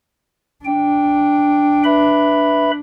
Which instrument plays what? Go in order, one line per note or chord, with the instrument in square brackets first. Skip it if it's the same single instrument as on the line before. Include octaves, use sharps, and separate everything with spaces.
[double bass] D4 [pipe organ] G5
[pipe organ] B4 E5 B5